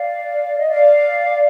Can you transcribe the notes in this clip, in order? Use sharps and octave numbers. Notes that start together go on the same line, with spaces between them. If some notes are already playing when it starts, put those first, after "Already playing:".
Already playing: D5 F5
D#5
D5 F5